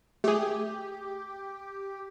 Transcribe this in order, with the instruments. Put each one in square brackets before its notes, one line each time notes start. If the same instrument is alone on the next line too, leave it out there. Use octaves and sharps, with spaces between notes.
[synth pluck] A3 G#4 [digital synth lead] G4